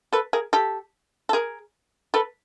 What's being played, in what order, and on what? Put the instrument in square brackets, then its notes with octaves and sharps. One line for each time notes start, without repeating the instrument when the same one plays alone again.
[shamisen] A4 B4
G#4 A#4
G4 A4
A4
G#4 A#4
A4 B4